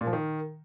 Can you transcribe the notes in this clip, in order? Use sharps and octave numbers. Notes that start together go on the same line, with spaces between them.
A#2
F3
D#3